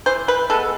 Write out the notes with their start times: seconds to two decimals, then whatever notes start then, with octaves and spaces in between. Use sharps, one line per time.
0.06 E3 C5
0.28 B4
0.50 G#3 B3 A4